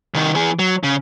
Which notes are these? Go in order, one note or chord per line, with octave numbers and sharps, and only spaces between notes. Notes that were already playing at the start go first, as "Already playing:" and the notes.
C2 D#3
E3 G#4
F#3
C#3